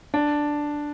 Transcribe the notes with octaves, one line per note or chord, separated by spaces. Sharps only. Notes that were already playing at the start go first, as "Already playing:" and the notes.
D4